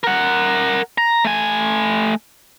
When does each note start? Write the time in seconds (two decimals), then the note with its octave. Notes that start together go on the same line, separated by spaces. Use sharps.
0.04 A#4 F#5
0.98 A#5
1.24 A3 G#5